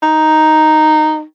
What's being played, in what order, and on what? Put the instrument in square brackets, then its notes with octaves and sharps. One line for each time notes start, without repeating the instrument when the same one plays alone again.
[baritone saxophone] D#4